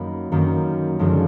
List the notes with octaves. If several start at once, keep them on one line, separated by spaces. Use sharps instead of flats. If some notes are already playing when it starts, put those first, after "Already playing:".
Already playing: F#2 D#3 A#3 B5
F#2 D#3 A#3
F#1 F#2 D3 F3 G#3